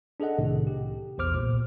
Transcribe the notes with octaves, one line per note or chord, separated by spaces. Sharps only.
D4 G#4 A4 D#5 F#5
C2 A2 C3 D#3
G4
A#1 E2 C5 D6 F6
C2 A#2